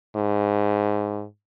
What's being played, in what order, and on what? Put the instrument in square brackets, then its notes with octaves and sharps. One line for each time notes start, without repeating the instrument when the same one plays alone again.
[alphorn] G#2